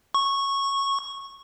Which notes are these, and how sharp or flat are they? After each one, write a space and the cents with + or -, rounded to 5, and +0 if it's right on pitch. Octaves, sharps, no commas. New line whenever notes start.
C#6 -10